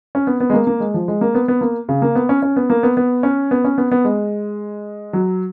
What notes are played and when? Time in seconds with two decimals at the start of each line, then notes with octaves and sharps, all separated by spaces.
0.15 C#4
0.27 B3
0.40 B3
0.50 G#3
0.54 A#3
0.67 A#3
0.80 G#3
0.94 F3
1.08 G#3
1.21 A#3
1.35 B3
1.48 B3
1.61 A#3
1.89 C#3
2.02 A#3
2.15 B3
2.29 C#4
2.43 C#4
2.56 B3
2.70 A#3
2.83 B3
2.97 B3
3.23 C#4
3.51 B3
3.64 C#4
3.78 B3
3.92 B3
4.05 G#3
5.13 F#3